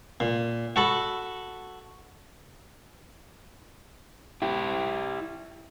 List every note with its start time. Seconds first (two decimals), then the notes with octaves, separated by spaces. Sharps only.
0.20 A#2
0.76 F#4 A4 B5
4.42 E4 G4